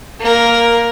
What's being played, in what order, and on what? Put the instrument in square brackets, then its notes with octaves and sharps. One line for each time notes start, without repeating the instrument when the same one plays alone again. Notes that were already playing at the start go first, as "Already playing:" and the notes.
[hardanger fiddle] A#3 A#4